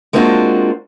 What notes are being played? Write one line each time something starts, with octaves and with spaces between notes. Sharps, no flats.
G#3 A#3 C4 D4 F4 F#4